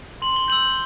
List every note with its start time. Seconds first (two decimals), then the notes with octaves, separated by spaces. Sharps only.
0.22 C6 F#7
0.36 G7
0.48 E6 G6 F#7